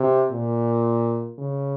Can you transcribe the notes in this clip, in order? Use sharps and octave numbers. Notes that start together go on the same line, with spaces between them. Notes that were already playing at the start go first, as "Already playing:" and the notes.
Already playing: C3
A#2
C#3